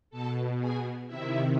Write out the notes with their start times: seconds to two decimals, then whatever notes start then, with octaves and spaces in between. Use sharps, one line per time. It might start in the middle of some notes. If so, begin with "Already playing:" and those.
0.10 B2 A4 A5
0.59 G#4 G#5
1.07 C3 D#3 E4 E5